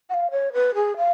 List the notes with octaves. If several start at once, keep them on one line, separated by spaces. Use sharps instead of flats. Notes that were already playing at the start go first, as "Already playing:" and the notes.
F#5
F5
C#5
B4
G#4
F5